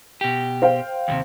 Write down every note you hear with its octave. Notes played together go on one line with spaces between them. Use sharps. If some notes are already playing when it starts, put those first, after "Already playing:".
B2 G4
C5 F5 G5
D#2 A2 C3